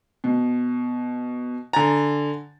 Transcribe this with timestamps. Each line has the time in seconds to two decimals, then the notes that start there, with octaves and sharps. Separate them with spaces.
0.24 B2
1.73 D3 G#5 A#5 A6